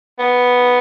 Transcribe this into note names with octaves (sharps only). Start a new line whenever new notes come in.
B3